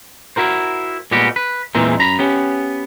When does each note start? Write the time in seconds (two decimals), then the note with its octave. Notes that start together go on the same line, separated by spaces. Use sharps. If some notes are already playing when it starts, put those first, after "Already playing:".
0.36 E4 F#4 A#4 C5
1.11 A#2 G3 G#3 B3 F#4 G4
1.36 B4
1.75 E2 A#2 E3 G#3 C4 A#4
1.98 F#2 A#5 B5
2.19 B3 C#4 G4